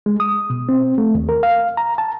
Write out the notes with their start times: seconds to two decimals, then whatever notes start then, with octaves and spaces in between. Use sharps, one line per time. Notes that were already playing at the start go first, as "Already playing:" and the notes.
0.06 G#3
0.20 D#6
0.50 B2
0.69 C4
0.98 A3
1.15 D#2
1.29 A#4
1.43 F5
1.77 A#5
1.98 A5